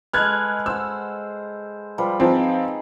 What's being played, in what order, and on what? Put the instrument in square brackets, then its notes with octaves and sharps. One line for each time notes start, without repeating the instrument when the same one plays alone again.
[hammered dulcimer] G#3 A4 B4 [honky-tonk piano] F6 F#6 G#6
[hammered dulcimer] C5 F#5 [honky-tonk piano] E6
[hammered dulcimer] F3 G3 B4
[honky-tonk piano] F3 C4 [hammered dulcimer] D#4 G#4